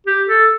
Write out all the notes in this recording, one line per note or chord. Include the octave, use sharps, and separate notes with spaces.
G4
A4